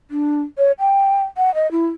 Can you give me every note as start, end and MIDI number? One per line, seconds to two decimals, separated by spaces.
0.10 0.41 62
0.58 0.72 73
0.79 1.22 79
1.37 1.53 78
1.54 1.70 75
1.71 1.87 64